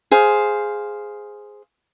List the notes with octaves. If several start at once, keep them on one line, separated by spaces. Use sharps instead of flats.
G#4 C5 F5